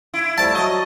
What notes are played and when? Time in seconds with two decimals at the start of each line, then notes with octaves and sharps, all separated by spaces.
0.14 E4
0.38 F3 G3 A3 A5
0.55 F#3 F#4 D#5